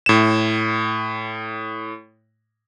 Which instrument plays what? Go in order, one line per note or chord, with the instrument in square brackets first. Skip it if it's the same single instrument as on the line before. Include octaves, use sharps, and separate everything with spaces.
[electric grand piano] A2 E7